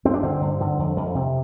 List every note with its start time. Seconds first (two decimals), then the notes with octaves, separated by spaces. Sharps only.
0.05 G2 C4
0.14 D4
0.23 D3 C4
0.41 G2
0.60 D3
0.79 F2
0.97 F2
1.15 C3